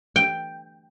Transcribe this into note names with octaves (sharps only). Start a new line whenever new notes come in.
G5